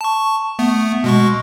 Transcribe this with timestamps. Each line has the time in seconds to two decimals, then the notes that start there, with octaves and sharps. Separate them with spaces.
0.01 A5 C#6
0.59 A3 B3
1.04 B2 G#3 C#6